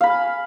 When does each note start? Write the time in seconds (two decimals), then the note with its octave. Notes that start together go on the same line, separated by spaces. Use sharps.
0.01 F5
0.03 B5
0.06 G#5